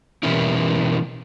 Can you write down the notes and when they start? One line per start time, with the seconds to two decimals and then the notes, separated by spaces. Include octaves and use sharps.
0.23 B2 E3 G3 A#3 C#4 E4